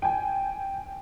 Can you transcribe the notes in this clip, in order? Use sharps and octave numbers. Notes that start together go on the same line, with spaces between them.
G5 G#5